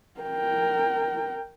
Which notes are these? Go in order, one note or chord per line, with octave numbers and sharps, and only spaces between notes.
A#4 G5